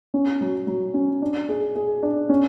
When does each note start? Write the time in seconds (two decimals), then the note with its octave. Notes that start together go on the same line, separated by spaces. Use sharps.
0.14 C#4
0.41 F#3
0.67 F#3
0.94 C#4
1.22 D4
1.49 G#4
1.76 G#4
2.03 D4
2.29 C#4